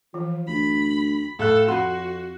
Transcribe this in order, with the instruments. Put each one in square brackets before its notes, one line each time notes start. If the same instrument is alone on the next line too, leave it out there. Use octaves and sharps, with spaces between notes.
[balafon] E3 [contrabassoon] F3
[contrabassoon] D2 [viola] B5
[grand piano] A2 F5 F#6 [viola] A4
[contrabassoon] F2 [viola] F#4 [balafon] F#5 B5 [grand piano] C6